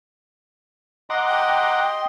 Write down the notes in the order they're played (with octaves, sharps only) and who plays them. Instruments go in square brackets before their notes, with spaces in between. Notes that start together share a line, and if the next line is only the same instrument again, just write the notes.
[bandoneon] D#5 C6 [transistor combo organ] F#5 A#5 D6
[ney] G5